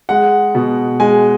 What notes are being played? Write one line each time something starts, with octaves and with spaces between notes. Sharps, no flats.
G#3 F#5
B2
G#3 G#5